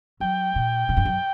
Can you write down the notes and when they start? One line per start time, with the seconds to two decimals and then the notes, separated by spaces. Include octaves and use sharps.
0.20 F#3 G5
0.55 A#2
0.89 A#2
0.97 G2
1.05 F#2